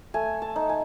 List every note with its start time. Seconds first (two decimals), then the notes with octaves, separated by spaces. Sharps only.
0.14 A3 G#5
0.42 A5
0.56 D#4
0.69 G#5